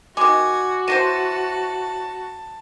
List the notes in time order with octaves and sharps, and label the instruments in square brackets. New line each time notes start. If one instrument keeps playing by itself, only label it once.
[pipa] D#3 G#3 [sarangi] F#4 [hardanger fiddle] G#5 [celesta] D6
[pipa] E3 F#3 C5 [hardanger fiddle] A5 [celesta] A#6 D#7